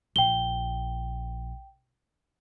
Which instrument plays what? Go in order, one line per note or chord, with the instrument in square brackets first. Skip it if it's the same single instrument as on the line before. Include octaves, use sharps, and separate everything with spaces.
[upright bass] A#1 [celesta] G5 G7